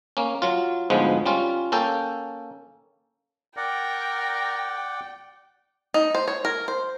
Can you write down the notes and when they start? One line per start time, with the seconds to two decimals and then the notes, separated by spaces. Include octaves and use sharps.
0.17 A#3 C#4
0.42 F#3 F4
0.90 D2 G#2 F3 G#3 B3
1.26 G3 C#4 F4
1.72 A#3 C#4 A4 G5
3.57 A#4 D5 F#5 G5
5.94 D#4
6.15 C5
6.28 C#5
6.45 A#4
6.68 C5